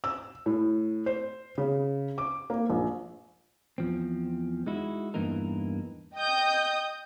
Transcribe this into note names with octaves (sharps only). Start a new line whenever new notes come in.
E6
A2
C5
C#3
D6
A#3
A#1
E2 F3 C4
G#3 D#4 E4 F#4
E2 G2 E3 A#3 D#4 A#4
D#5 G5 D#6 G6